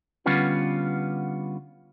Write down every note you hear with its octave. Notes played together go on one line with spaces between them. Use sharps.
D3 G3 B3 C#4 F4 B4